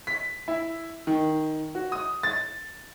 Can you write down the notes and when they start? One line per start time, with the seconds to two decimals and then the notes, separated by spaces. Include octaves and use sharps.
0.07 B6
0.48 E4
1.07 D#3
1.75 F#4
1.92 D#6
2.23 A6